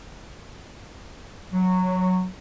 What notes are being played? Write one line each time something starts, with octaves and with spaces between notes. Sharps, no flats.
F#3